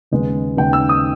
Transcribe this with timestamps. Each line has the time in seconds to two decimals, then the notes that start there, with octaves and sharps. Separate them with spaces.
0.11 D#2 C#3 G#3 B3
0.57 D#2 C#3 G#3 B3 G5
0.73 E6
0.89 D#6